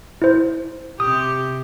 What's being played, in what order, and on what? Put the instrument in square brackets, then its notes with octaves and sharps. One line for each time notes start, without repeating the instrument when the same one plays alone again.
[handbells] E4 C5
[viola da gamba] C3 G4 [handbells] D#6